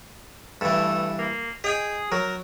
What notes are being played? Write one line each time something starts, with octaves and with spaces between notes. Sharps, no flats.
G2 E3 A3
A#3
G#4 D#5 G5 G#5
F#3 A#4